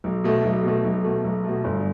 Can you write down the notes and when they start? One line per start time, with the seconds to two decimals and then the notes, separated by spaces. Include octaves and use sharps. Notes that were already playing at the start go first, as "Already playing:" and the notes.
0.04 B1
0.24 B2 A3
0.44 B1
0.64 B2 A3
0.84 B1
1.04 B2 A3
1.24 B1
1.44 B2 A3
1.64 G1